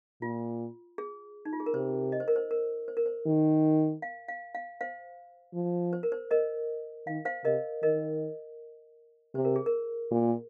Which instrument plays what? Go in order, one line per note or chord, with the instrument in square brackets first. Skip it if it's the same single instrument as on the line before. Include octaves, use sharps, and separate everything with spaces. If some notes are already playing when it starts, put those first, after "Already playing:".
[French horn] A#2 [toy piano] F4
[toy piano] G#4
D#4
F4
G#4
A#4
[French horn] C3 [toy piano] C5
[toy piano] D#5
C5
A#4
C5
A#4
C5
A#4
C5
[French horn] D#3
[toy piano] F5
F5
F5
C5 F5
[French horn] F3
[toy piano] C5
A#4
C5
A#4 D#5
[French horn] D#3 [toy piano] F5
[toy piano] C5 F5
[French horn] C3 [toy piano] A#4 D#5
[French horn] D#3 [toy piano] A#4 D#5
[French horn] C3 [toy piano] C5
[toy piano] A#4
G#4
A#4
[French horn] A#2